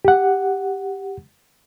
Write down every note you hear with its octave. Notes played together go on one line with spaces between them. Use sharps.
G4 F#5